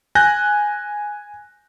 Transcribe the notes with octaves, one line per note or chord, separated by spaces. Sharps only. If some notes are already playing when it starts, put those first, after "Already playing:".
G#5 F#6 G6 A#6